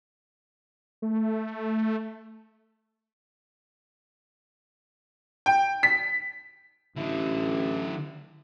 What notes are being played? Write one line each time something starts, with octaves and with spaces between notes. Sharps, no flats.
A3
G5
B6
A1 D3 E4